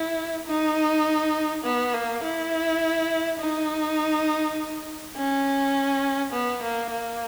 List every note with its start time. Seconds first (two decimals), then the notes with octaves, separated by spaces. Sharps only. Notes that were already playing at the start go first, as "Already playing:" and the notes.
Already playing: E4
0.47 D#4
1.64 B3
1.94 A#3
2.24 E4
3.40 D#4
5.16 C#4
6.33 B3
6.63 A#3
6.91 A#3